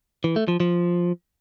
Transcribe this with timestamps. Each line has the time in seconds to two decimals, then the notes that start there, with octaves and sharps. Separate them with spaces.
0.24 E3
0.36 A3
0.48 F3
0.60 F3